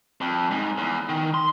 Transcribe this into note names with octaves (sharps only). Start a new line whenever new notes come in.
F2
G#2
E2
D#3
C6